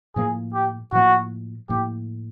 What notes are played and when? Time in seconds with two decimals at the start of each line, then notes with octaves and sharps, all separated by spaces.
0.16 A2 F3 A#3 G#4
0.54 G4
0.92 A2 F3 A#3 F#4
1.69 A2 F3 A#3 G4